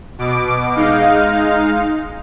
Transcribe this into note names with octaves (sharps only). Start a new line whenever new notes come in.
B2 D6 D7
G#3 D#4 F5